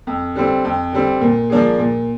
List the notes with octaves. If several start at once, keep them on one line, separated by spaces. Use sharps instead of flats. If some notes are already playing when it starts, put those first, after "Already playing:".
F2
D3 G3 C4
F2
D3 G3 C4
A#2
F3 A#3 D4 G#4
A#2